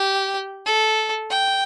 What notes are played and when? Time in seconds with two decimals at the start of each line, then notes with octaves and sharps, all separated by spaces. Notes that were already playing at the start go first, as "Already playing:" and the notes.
Already playing: G4
0.65 A4
1.31 G5